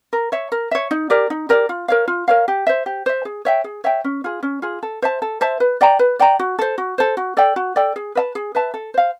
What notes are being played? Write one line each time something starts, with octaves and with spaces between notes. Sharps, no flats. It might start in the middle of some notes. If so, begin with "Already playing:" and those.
A#4
C#5 E5
A#4
C#5 E5
D#4
G4 A#4 D5
D#4
G4 A#4 D5
F4
A#4 C#5 F5
F4
A#4 C#5 F5
G4
C5 E5
G4
C5 E5
G#4
C#5 E5 G5
G#4
C#5 E5 G5
C#4
F4 G#4
C#4
F4 G#4
A4
C5 E5 A5
A4
C5 E5 A5
B4
D5 G5 A#5
B4
D5 G5 A#5
F#4
A4 C5
F#4
A4 C5
F#4
A4 D5 G5
F#4
A4 D5 G5
G#4
B4 E5 A5
G#4
B4 E5 A5
A4
C5 F5